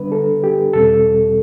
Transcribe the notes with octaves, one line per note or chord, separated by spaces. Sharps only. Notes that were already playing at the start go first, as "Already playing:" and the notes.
Already playing: D3 G3 B3 D4 B4
A4
G4
E2 B2 G3 C4 A4